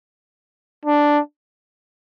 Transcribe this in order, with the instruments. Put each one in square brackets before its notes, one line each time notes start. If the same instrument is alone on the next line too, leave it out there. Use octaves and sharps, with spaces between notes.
[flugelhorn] D4